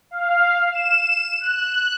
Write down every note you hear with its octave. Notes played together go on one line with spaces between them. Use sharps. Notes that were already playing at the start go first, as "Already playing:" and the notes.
F5
E7
F#6